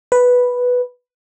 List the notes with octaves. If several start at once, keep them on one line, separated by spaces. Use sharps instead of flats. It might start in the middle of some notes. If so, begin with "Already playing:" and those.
B4